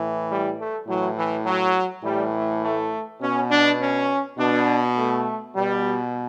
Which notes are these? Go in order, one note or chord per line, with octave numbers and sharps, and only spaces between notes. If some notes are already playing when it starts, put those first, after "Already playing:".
Already playing: A2 E3
G3
A3
A2 E3 F#3
E3
F#3
A2 E3 G3
A3
A3
B2 C#4
D4
C#4
B2 D4
A3
B2 G3